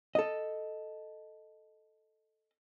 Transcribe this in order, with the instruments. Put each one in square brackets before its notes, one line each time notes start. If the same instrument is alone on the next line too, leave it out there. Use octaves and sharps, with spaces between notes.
[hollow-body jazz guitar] A4 D#5